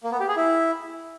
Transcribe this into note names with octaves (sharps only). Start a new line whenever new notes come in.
A#3
B3
G4
G#4
E4